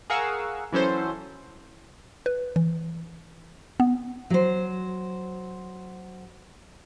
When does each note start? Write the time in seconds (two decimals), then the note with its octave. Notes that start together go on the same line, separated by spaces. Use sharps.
0.10 G#4 A#4 F5 F#5 C#6 E6
0.72 E3 F#3 C#4 A4 C5
2.26 B4
2.56 E3
3.80 B3
4.30 F#3 C5